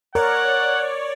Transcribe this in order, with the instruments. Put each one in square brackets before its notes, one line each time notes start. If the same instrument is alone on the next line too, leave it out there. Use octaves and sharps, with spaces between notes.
[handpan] A#4 [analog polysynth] C#5 D5 [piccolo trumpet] F#5